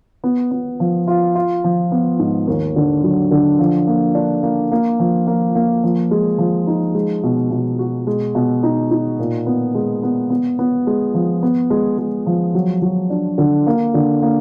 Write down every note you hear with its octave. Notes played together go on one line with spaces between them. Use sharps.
B3
B3
F3
F4
F4
F3
B3
G#2
D#2
D3
F#3
D3
F3
A#3
D4
A#3
A#3
F3
A#3
A#3
F3
G#3
F3
D#4
G#3
B2
B2
F#4
G#3
B2
D#4
D#4
A#2
B3
G#3
B3
B3
B3
G#3
F3
B3
G#3
G#3
F3
F#3
F#3
D4
D3
A#3
D3
A#3